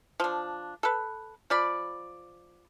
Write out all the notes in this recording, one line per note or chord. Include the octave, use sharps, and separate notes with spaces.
F3 D4
A4 B4
F3 D5 B5